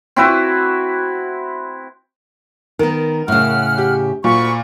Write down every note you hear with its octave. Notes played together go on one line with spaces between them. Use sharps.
C4 E4 F#4 B4
D#3 B3 A#4
A2 C#3 F#5 F6
G4
D2 A#2 B5 C#6